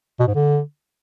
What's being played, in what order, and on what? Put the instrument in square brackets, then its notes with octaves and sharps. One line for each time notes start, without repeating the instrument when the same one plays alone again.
[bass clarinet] B2
G#2
D3